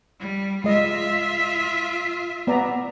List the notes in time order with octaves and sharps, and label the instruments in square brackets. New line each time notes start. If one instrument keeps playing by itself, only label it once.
[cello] G3
[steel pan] G#3 D#5 [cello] F4 E5
[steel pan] B3 D5 A#5